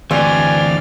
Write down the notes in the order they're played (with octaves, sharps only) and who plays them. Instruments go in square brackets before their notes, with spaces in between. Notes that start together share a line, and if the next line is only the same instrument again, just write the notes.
[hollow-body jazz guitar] D2 [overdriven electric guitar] E3 C4 [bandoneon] D5 F6 [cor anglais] G#5